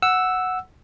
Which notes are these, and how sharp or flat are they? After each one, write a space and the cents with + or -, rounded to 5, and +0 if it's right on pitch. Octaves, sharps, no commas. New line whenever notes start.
F#5 -5 E6 +0